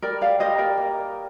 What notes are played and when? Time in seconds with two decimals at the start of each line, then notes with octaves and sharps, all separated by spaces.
0.02 G3 A#4 D5
0.21 D5 F5
0.40 G3 C5 D#5
0.58 A#4 D5
0.77 A#3